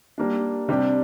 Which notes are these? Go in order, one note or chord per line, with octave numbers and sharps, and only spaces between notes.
G3 A#3 D4
C3 G3 D4 G4